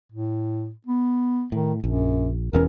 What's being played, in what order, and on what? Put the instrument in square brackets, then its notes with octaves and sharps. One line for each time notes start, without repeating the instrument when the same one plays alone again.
[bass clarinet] A2
B3
[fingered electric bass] A2 [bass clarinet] D#3
[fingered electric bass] A#1 [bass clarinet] F#2
[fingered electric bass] E1 E2 C#4 [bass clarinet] A#4